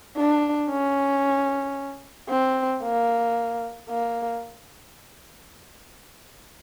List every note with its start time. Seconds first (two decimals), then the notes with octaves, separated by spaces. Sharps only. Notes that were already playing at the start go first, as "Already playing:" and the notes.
0.17 D4
0.70 C#4
2.29 C4
2.83 A#3
3.89 A#3